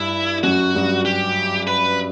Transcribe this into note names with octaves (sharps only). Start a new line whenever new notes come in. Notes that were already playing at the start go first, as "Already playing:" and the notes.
Already playing: G2 E4
F#2 F#4
G2
G4
B4